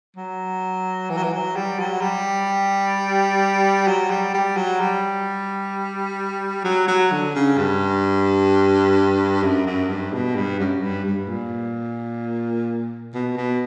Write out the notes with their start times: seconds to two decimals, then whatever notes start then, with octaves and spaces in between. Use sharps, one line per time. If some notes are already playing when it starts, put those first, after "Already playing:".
0.16 F#3
1.10 E3
1.17 F#3
1.23 E3
1.33 F#3
1.56 G3
1.79 F#3
2.01 G3
3.88 F#3
4.10 G3
4.34 G3
4.57 F#3
4.80 G3
6.65 F#3
6.88 F#3
7.11 D3
7.35 C#3
7.58 G2
9.43 F#2
9.66 F#2
9.89 G2
10.13 B2
10.35 G2
10.59 F#2
10.82 G2
11.05 G2
11.28 A#2
13.14 B2
13.37 B2